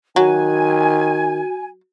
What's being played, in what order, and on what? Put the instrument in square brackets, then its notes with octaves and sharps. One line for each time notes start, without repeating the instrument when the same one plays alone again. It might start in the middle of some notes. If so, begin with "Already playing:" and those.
[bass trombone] D#3 [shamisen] F#3 [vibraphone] F#4 [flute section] G#5